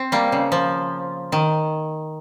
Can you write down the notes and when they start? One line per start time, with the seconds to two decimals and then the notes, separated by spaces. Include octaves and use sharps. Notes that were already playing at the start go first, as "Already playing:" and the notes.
Already playing: C4
0.12 G3 A#3
0.32 C#3
0.52 F3
1.32 D#3